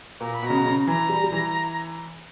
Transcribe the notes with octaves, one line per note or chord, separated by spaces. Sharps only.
A#2 A#5
B5
B2
C#3 A#5
B2
C#3
E3 A#5
G3
G3
E3